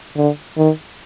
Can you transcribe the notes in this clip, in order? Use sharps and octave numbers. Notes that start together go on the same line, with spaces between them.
D3
D#3